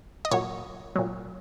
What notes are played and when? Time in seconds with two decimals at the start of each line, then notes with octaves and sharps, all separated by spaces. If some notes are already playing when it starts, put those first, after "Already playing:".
0.25 D#5
0.31 A#2 F#3 C#5
0.96 A#2 F#3